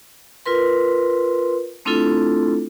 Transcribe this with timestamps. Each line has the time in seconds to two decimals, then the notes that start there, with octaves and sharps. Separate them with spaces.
0.46 F4 A#4 B4 C6
1.85 A3 C4 D4 E4 F4 A4